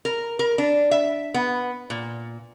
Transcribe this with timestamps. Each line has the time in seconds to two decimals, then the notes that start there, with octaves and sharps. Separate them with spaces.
0.05 A#4
0.39 A#4
0.58 D4
0.91 E5
1.34 B3
1.90 A#2